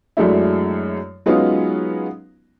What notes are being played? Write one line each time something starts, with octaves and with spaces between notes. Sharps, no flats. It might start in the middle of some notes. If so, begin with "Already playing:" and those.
F#2 F#3 G#3 A3 D4 E4
F#3 G#3 B3 C#4 D#4 F4